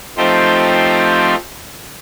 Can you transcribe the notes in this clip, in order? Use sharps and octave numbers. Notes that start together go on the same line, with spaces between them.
F3 A3 C4 D#4 G4 C5